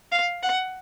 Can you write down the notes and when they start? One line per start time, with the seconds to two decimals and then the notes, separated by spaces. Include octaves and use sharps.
0.12 F5
0.43 F#5